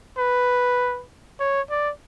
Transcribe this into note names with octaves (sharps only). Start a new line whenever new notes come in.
B4
C#5
D5